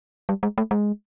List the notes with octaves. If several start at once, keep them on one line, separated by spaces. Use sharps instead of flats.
G3
G#3
A3
G#3